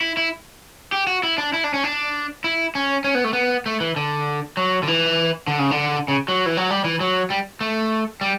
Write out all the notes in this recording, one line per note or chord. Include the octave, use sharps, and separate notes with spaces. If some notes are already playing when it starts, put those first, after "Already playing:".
E4
E4
G4
F#4
E4
D4
E4
D4
C#4
D4
E4
C#4
C#4
B3
A3
B3
A3
E3
D3
F#3
D3
E3
D3
C#3
D3
C#3
F#3
E3
F#3
G3
E3
F#3
G3
A3
G3